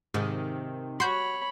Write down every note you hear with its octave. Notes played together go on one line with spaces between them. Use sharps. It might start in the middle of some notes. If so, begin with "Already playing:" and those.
G#2 C3 D#3
F#4 C#5 B5 C6 G6